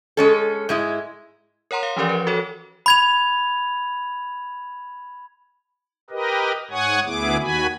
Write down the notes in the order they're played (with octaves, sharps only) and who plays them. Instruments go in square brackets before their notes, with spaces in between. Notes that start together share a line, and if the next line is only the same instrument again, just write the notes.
[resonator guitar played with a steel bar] G#3 C#4 A4
G#2 G#3 E4
[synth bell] A#4 C#5 F#5 A#5 C6
F5
E3 F3 C#4 G4 A#4 D5
B4
F#4 A4 C#5
[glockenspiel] B5 G#6 F7
[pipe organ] G4 A#4 B4 D#5
G#2 C#5 F#5 G#5 C#6 D#6
D2 B3 E4 G#4 D6
D#2 D#3 F#4 G#5 B5